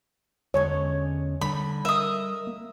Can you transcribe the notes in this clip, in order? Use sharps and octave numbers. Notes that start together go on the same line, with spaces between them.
E2 D3 G#3 C#4 C#5
D3 G3 B5
A#4 D#5 E5 D#6
A#3